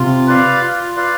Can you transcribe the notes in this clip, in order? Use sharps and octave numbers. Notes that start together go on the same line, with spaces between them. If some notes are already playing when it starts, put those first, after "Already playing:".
Already playing: C3 F4
B4 D5 F5
F4
B4 D5 F5